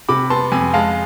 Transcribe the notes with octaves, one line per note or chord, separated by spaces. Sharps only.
C3 B5 D6
B3 A5 C6
F2 G#5 B5
G#3 F5 A5